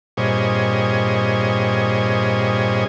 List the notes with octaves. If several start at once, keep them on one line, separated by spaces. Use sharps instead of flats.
G2 A#2 C4 G#4 C#5 D#5